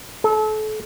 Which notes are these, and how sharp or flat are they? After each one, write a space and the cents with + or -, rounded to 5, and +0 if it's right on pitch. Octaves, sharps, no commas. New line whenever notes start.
A4 -30